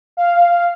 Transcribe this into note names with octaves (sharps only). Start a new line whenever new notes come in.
F5